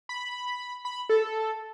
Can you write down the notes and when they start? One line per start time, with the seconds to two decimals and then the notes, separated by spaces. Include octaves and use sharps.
0.09 B5
0.85 B5
1.09 A4